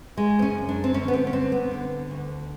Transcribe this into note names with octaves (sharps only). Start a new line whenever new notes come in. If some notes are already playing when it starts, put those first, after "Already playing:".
C#3 G#3
C4
C#4
F#2
D4
C4
D3 C#4
B3
C4
C#4
G2 C4
B3
D3
D2